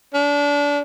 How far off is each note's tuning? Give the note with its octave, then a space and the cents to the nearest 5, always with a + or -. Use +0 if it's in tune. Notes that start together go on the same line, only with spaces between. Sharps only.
D4 -30